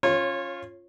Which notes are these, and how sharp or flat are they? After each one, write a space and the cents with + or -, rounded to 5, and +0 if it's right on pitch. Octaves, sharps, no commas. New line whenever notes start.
C#4 +0 F4 +0 C#5 -25